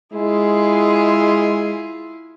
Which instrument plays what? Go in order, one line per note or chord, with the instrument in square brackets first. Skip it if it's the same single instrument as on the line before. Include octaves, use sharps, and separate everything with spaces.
[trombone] G#3 [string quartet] E4 F4 G#4